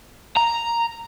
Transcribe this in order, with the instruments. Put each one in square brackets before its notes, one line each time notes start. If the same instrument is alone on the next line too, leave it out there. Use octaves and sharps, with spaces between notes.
[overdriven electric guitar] A#5